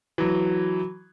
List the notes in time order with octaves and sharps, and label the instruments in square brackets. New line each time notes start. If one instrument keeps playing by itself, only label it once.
[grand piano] E3 F#3